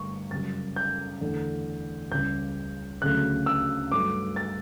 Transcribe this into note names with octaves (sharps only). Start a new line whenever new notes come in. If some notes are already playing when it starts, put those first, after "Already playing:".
Already playing: G2 D3 A3 C#6
F#2 C#3 G3 A6
G6
E2 D3 A3
C#2 C#3 G3 G6
D2 C#3 F#3 A3 F#6
E6
G2 F#3 A3 D6
A6